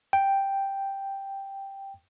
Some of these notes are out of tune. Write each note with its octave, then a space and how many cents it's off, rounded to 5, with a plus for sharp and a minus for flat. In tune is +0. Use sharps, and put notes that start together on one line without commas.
G5 +0